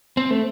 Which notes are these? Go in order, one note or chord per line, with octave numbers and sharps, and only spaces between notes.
C4
A3